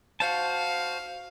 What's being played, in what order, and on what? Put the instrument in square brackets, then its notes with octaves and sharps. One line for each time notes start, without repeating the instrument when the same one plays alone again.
[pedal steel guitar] F#4 C5 A5 [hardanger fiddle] F5